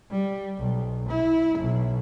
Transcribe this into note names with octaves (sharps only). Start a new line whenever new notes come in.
G3
B1
E4
B1